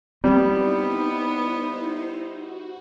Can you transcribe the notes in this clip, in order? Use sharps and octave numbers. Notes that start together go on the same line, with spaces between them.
G3 B3 C4 D#4 E4 C5
F#4